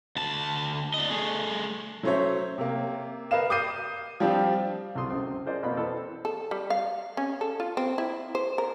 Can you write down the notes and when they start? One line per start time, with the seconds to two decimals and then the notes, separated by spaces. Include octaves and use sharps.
0.16 D2 A5
0.94 D4 D#5
1.10 A3 G#4
2.03 F#3 A3 C#4 C5 C#5 E5
2.58 C3 A#3
3.31 A#4 B4 D#5 F5 E7
3.50 D6 D#6 G6 C7 D#7
4.20 F3 G3 C4 D4 F4 G4
4.95 C2 F#3 A4 C6 D#6
5.10 C#2 F#2 C4
5.45 G#4 A#4 C5 D5 D#5
5.63 F2 B2 A#3 C4 B5
5.76 E3 C4 A4
6.25 A4
6.51 G3
6.70 F5
7.17 C#4
7.41 A4
7.60 F4
7.77 C4
7.98 E4
8.35 C5
8.58 A#4